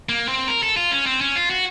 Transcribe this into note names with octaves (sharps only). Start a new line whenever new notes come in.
A#3
C4
A#4
A4
F4
C#4
C4
C#4
F4
F#4